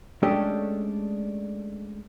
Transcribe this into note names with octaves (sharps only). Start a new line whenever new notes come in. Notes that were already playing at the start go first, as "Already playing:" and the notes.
G#3 A3 C#4 D4 G4 A4